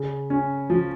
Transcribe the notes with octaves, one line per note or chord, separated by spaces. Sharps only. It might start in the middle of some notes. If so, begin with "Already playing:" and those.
Already playing: C#3
C#4
F3